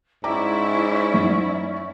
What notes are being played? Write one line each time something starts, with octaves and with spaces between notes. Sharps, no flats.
G#2 C#4 E4 D5 E5 G5 A#5 D6
F#2 D#4